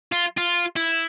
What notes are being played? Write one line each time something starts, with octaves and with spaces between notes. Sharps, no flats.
F4
F4
E4